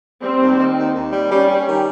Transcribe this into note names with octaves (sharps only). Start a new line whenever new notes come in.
G3 C4
D#2
D#3
D#2
D#2
G3
G3 C#4
G3
D#3